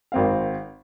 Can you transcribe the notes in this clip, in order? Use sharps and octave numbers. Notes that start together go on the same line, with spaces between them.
G#1 C4 F5